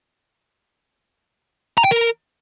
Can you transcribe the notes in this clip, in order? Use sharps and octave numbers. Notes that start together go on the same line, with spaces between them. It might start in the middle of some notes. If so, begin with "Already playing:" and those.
A#5
G5
A#4